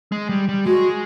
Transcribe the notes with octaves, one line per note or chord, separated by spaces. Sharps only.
G#3
G3
G3
G#3 F#4